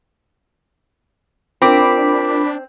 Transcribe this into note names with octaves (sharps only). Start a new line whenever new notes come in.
C4 D4 F4 A#4 B5 D6 B6